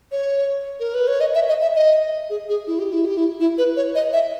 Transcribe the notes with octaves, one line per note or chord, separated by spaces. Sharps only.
C#5
A#4
B4
C#5
D#5
E5
D#5
E5
D#5
G#4
G#4
E4
G4
E4
G4
E4
E4
B4
C#5
D#5
E5